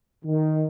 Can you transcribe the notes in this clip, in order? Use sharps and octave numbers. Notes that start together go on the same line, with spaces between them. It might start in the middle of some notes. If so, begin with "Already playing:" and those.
D#3